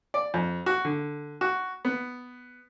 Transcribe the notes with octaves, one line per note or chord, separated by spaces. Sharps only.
D5
F2
F#4
D3
F#4
B3